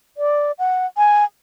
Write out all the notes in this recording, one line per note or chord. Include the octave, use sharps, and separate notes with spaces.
D5
F#5
G#5